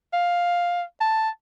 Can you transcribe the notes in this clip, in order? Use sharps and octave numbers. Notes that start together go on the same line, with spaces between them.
F5
A5